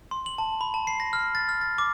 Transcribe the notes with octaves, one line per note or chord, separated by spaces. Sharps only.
C6
F#7
A5
B5
A5
C7
A#6
F6
A6
F6
A6
D6